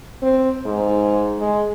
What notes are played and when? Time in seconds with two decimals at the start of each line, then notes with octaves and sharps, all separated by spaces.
0.22 C4
0.65 G#2
1.39 G#3